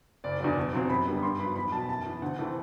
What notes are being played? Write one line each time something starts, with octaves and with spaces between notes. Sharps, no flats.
F#1 D5
E2 D3 F#3 D5
E1
E2 C3 F#3 C4
F#2 B5
D3 G3 B3
G2 C6
F#3 B3 B5
E2 B5
B2 F#3 A5
F#2 A5
E3 B3
D2 F#5
C3 E3 A3 C4